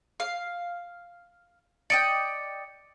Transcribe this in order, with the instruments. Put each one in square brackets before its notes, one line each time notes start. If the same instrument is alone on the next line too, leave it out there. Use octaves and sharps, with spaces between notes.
[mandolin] F5
[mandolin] D5 D#5 G5 [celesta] C#7